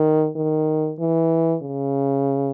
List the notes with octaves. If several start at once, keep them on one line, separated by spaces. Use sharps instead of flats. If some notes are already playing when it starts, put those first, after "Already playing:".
Already playing: D#3
D#3
E3
C#3